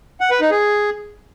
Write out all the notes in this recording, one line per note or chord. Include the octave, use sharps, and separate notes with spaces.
F#5
B4
D#4
G#4